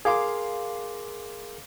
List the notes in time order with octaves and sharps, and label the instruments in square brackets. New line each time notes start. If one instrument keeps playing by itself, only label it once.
[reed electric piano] G#4 A#4 C6 [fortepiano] F5 D6